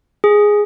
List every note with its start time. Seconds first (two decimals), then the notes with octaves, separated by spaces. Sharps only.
0.24 G#4